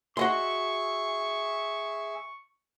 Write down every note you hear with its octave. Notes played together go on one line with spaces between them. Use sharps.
F#4 G#4 D#5 E5 C6 C#6